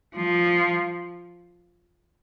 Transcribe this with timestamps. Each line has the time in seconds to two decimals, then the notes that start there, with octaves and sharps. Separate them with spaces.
0.16 F3